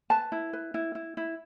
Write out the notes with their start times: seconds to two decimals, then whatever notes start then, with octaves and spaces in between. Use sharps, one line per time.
0.10 B4 A5
0.32 E4
0.53 B4
0.74 E4
0.95 E4
1.17 E4